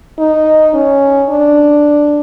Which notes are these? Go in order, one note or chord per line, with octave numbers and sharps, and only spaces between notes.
D#4
C#4
D4